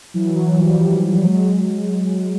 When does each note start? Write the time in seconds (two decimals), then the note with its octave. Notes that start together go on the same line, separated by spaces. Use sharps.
0.14 E3 F#3
0.36 E3 F#3
0.58 F3 G3
1.25 F#3 G#3